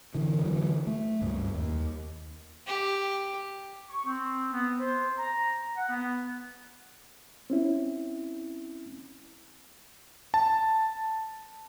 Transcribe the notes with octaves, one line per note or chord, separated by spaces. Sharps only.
D3 E3
D3 E3 F#3
A3
C#2 G2
D#2
G4
C#6
C4
B3
C5
A#5
F#5
B3
C4 C#4 E4
A5